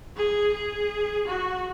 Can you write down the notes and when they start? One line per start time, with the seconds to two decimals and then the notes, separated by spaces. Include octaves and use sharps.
0.16 G#4
0.53 G#4
1.27 F#4